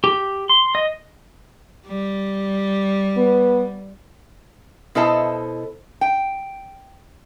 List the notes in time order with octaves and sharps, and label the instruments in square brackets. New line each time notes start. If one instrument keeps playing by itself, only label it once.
[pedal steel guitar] G4
C6
D#5
[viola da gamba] G3
[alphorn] B3
[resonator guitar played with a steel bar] B2 E4 A4 C5 D#5 A5
G5